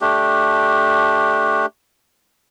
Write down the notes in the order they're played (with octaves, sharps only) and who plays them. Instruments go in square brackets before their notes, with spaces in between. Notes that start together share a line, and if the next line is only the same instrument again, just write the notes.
[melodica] A3 D4 G4